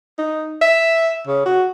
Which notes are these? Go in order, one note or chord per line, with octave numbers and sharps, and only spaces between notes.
D#4
E5
C#3
F#4